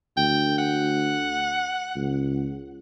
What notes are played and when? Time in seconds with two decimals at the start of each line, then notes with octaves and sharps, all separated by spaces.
0.17 D2 G5
0.59 F#5
1.96 C#2